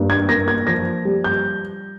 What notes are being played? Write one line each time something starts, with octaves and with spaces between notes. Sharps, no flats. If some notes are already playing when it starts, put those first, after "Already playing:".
Already playing: G2 A#3
G#6
A#3 A#6
G#6
F3 A#6
G3
G6